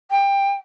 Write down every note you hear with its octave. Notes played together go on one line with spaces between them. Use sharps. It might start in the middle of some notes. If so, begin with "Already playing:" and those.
G5